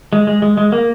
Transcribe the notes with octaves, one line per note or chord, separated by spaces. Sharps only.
G#3
G#3
G#3
G#3
A#3